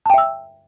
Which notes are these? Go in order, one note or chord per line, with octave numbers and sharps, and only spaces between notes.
E5 G5 A5 E6